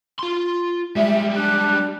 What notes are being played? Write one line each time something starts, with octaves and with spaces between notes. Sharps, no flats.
F4 C6
G3 G#3 E5
D4 G4 F#6